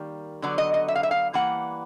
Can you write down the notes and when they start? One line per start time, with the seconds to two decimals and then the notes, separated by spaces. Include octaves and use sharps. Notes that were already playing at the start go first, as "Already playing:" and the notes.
Already playing: D#3 G3 A#3
0.42 D3 F#3 B3 D5
0.58 D#5
0.74 D#5
0.88 E5
0.95 F5
1.03 E5
1.11 F5
1.33 E3 G3 A#3 F#5